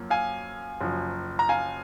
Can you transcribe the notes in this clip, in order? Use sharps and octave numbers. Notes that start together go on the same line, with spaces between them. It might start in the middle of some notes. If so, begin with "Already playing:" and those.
Already playing: F#2 F3 A#3
F5 G#5
F#1 F#2 F3
A#5
F5 G#5